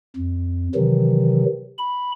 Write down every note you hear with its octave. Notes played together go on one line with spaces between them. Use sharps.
F2
C3 D#3 E3 F#3
B5